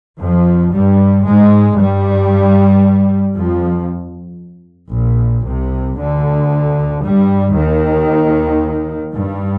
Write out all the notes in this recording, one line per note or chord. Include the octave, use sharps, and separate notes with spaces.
F2 F3
G2 G3
G#2 G#3
G2 G3
F2 F3
A#1 A#2
C2 C3
D2 D3
G2 G3
D#2 D#3
G2